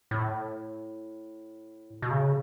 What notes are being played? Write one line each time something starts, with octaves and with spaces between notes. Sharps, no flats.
A2
B2
C#3